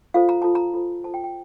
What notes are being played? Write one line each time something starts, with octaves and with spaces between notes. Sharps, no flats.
F4 A4 C5 F5
A#5
F4 A4 C5 A5
A#5
F4 A4 C5
F4 A4 C5 A5
G5
G5